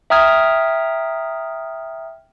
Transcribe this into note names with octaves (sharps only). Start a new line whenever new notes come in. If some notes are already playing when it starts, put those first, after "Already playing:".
E5 G5 A#5 D#6 F6 G#6